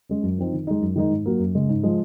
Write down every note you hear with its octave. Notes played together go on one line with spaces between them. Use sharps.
G#3 C#4
F#2
F3 C4 D#4
D#3
G#3 D#4
F#2
D#3 G#3 D#4
G#2
F#3 A#3
F#2
C#3 G#3
G#2
F3 G#3